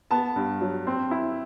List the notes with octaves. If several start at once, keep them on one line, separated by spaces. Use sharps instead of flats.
B3 A5
G2
F#3
C4
E4